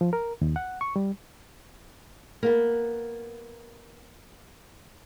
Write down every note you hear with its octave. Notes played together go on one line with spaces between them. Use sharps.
F3
A#4
D#2
F#5
C#6
G3
A#3 B3